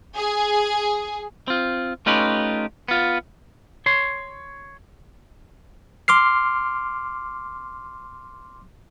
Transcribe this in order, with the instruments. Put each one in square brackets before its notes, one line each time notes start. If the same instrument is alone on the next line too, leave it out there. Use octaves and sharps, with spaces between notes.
[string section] G#4
[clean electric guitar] C4 F4
A3 C#4 D#4 F4 G4 B4
B3 F4
C#5 C6
[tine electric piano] C6 D6 F6 C7